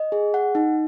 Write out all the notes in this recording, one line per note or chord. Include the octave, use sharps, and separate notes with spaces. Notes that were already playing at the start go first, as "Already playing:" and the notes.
Already playing: D#5
G#4
F#5
D#4